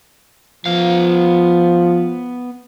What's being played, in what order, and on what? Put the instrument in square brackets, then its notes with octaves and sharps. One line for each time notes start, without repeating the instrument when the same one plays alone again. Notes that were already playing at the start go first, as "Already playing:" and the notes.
[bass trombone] F3 [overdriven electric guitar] B3 F5